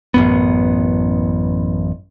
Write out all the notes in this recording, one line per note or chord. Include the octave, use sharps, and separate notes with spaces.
A1 F#2 B3